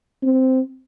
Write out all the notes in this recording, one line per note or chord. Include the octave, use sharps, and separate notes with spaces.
C4